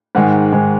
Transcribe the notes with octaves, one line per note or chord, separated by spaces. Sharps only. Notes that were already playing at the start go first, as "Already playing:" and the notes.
G#2 D#3 G#3 F#5
G#2 D#3 G#3